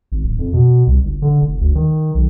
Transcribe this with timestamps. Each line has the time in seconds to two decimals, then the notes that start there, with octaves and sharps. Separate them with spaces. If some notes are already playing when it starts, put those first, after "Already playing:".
0.12 G#1
0.24 D1
0.39 F2
0.53 B2
0.87 C2
1.03 G1
1.22 D3
1.42 F1
1.61 D2
1.75 D#3
2.15 B1